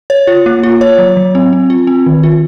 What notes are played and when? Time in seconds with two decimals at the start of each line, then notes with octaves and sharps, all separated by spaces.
0.10 C#5
0.27 F4
0.46 A#3
0.63 F4
0.81 C#5
0.98 F#3
1.17 F#3
1.35 C4
1.53 C4
1.70 F4
1.87 C4
2.06 D#3
2.23 F4